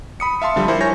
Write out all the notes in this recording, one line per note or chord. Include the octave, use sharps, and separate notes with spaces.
B5 D#6 C#7
E5 F5 A5 C6
D3 F3 G3
G3 E4 A#4 C5
C#5 G#5 C#6 G6 A#6